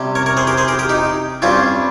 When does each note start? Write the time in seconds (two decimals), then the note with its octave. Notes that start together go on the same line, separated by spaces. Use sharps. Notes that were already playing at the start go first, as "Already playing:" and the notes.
Already playing: C3 G3 C#4
0.15 A#4 C#5
0.26 A#4 C#5
0.37 G#4 C5
0.47 G4 A#4
0.58 G#4 C5
0.68 G4 A#4
0.79 G4 A#4
0.89 D#4 G4
1.42 G2 G3 C4 C#4 F4